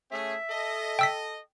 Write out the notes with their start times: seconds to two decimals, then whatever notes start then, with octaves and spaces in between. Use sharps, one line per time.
0.12 A3 C#4 G#4 E5
0.51 A4 D#5
0.99 G5 E6 B6